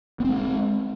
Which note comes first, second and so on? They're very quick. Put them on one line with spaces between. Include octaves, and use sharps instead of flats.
B3 C4 G#3